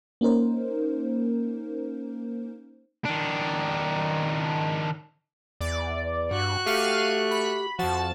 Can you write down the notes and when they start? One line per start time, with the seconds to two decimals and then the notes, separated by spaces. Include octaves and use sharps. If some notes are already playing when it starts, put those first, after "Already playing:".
0.21 A#3 C#4 D#4 A#4 C5
3.05 D#3 D4
5.61 E2 D5
6.31 G2 F#4 F#6
6.66 A3 G4 F5 F6 D#7
7.31 B5
7.79 F2 F3 F#4 A5